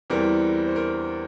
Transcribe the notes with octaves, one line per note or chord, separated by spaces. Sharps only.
E2 E3 G3 C4 A#4
C5
A#4